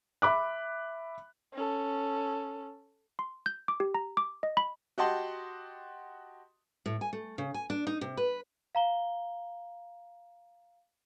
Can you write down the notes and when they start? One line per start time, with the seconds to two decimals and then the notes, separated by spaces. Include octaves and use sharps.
0.22 E5 B5 D6 F#6
1.54 C#4 A4
3.19 C6
3.46 G6
3.68 D6
3.80 G4
3.95 A#5
4.17 D6
4.43 D#5
4.57 B5
4.98 F#4 G4 D#5 F#5 A5 C6
6.86 A2
7.01 G#5
7.13 A3
7.38 C#3
7.54 G#5
7.70 D4
7.87 D#4
8.01 C3
8.17 B4
8.75 F5 A#5 G7